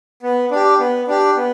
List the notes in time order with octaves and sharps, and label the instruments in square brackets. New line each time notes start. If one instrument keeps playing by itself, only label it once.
[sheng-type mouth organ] B3
D4 G4
B3
D4 G4
B3